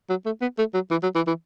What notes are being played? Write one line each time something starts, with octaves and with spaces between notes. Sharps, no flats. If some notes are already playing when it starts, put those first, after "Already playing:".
F#3
A3
B3
A3
F#3
E3
F#3
E3
E3